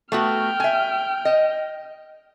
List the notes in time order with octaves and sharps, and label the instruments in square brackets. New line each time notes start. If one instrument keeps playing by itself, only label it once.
[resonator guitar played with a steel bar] A3 B3 F#4 [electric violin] G5 F6
[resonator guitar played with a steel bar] E5 G#5
D#5